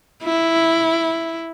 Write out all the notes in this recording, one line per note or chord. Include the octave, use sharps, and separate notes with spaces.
E4